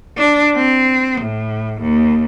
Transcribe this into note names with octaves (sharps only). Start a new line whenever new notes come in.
D4
C4
A2
D#2